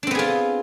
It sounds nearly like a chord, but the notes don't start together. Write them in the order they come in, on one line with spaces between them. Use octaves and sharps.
D4 C4 B3 G#4 F4